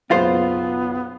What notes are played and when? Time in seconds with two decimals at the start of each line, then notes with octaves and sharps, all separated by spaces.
0.11 F#1 B1 B3 F4 B4 C5